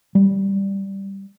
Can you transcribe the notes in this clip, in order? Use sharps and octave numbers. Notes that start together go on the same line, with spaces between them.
G3